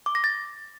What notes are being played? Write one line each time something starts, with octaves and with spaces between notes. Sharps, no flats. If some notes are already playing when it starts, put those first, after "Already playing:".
D6
A#6
A6